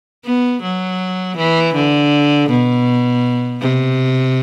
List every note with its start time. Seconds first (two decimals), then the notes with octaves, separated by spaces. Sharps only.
0.25 B3
0.62 F#3
1.37 E3
1.75 D3
2.49 B2
3.61 C3